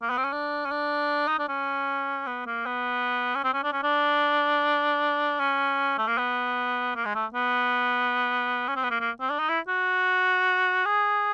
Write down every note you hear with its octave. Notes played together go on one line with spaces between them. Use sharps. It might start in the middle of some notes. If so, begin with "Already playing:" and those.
A#3
B3
C4
C#4
D4
C#4
D4
D#4
D4
C#4
B3
A#3
B3
C#4
C4
C#4
D4
C#4
D4
C#4
A3
A#3
B3
A#3
G#3
A3
B3
C#4
C4
B3
A#3
A#3
C4
D4
D#4
E4
F#4
G#4